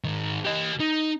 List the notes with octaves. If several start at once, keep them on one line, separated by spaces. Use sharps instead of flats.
G#2 D#3
G4 D#5
D#4